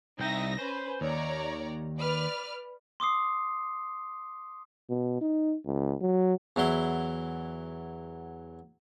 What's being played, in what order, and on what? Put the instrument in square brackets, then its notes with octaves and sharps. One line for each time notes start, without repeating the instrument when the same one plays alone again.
[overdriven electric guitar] C2 G5 [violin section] D#4 E5 A#6
[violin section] C#4 B4 [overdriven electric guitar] C5
[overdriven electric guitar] D#2 [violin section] C#5 D5 A#5
[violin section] B4 D5 F6
[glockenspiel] C6 D6 D#6 C7
[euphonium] B2
D#4
C#2
F#3
[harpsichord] E2 F#3 E4 C6